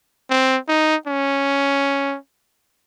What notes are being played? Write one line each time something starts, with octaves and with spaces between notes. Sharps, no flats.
C4
D#4
C#4